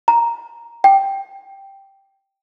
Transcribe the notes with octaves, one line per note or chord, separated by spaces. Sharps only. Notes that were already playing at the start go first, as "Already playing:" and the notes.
A#5
G5